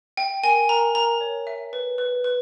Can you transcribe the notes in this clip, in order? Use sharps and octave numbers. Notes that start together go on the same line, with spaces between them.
E5 G5
A#4 G#5
A#4 A#5
A#4 A#5
C#5
E5
B4
B4
B4